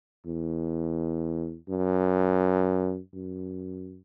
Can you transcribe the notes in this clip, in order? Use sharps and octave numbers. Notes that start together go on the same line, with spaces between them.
E2
F#2
F#2